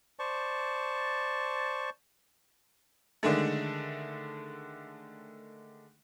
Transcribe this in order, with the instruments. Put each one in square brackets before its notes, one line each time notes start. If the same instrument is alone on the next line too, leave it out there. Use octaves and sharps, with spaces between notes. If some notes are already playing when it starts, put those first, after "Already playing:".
[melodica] C5 D5 A5 C#6
[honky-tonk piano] D3 D#3 G#3 A3